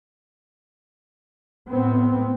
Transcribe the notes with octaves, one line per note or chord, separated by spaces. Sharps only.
A2 B3 C4